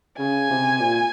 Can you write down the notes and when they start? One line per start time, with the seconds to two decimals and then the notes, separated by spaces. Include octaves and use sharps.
0.19 C#3 G#5
0.50 C3
0.81 A#2